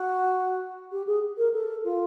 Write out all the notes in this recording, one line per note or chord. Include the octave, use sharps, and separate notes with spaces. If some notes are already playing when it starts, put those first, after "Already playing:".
Already playing: F#4
G4
G#4
A#4
A4
F4